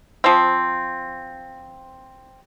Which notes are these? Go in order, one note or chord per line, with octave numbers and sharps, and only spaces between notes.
F3 C4